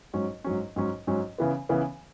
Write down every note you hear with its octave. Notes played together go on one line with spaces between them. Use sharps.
G#2 F#3 C#4
G#2 F#3 C#4
G#2 F#3 C#4
G#2 F#3 C#4
C#3 E3 B3
C#3 E3 B3